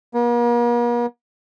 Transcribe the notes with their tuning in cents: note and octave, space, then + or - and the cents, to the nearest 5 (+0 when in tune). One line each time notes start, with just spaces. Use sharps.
A#3 +45